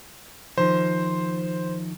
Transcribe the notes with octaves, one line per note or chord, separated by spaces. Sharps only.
D#3 F3 C5